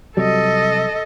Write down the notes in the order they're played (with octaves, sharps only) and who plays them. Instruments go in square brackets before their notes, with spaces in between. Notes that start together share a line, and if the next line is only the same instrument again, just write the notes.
[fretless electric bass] C3 F#3 G3 [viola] A4 D#5